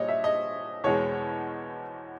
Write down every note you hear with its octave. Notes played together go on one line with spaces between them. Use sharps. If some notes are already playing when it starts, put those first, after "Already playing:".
Already playing: A#2 G3 C#5 D#5
E5
D#5
E2 B2 G#3 C#5